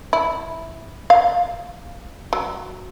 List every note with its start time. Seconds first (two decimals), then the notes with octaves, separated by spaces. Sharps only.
0.13 E4
1.10 F5
2.33 F#3